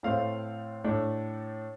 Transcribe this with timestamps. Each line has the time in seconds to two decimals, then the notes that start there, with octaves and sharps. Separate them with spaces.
0.03 A2 A3 C4 F5
0.84 A2 A3 D4